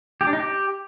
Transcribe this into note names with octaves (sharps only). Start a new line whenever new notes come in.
G4
D4
D#4
G4